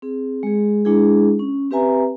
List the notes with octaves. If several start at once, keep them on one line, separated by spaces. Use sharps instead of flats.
C4 G#4
G#3 G#4
G#3 D4 E4 G#4
C#4
C4 G4 B4 E5 G#5 A#5